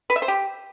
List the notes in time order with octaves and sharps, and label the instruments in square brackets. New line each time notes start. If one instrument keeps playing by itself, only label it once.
[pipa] B4
E5
C5
G4